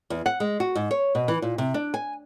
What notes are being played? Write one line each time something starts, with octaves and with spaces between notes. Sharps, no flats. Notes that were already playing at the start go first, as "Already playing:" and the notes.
E2
F#5
G#3
F#4
G#2
C#5
B2
E3
A#2
C3
D4
G#5